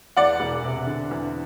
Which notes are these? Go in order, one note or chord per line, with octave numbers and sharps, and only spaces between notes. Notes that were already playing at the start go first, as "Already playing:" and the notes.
E2 D5 F#5
E1
C3
D3
E2